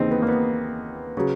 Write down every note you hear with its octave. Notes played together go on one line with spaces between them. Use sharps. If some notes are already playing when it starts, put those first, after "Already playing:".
Already playing: D#2 C#3 E3 C4 D#4
B3
A#3
B3
C#3 F#3